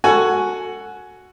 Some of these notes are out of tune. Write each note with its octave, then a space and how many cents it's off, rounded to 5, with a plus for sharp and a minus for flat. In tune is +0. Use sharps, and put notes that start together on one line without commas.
F#4 +0 A4 +25 G#5 +15